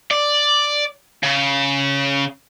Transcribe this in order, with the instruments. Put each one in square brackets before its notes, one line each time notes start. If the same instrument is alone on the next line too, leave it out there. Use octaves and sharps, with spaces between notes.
[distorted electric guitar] D5
C#3